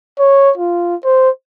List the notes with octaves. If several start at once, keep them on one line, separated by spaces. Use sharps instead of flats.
C#5
F4
C5